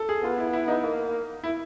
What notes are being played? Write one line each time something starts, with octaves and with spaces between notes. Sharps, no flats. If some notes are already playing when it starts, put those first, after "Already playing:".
Already playing: A4
G#4
B3 F4
E4
E4
D#4
A#3
E4